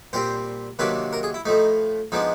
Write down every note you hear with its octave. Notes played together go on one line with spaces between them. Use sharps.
A#2 G3 C4 C5
C3 D#3 F#3 A#3 D4 B4
A#4
G#4
E4
A2 F3 A3 D#4
F3 G#3 B3 D4 D#4